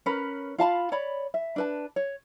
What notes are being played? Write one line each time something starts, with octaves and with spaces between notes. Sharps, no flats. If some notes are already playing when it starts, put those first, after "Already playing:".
C#4 A#4 B4 B5
F4 F5 A5 B5
C#5 D5 B5
E5
D4 B4 A5
C#5